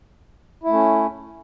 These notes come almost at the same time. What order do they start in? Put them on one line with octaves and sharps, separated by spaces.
E4 A3 C#4